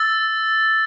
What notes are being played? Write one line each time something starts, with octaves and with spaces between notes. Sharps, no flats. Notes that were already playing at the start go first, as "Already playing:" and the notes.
Already playing: E6 A6